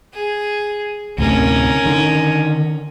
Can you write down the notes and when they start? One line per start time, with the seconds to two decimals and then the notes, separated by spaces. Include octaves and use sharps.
0.13 G#4
1.18 D2 A2 C3 C#4 A#4
1.85 D3 D#3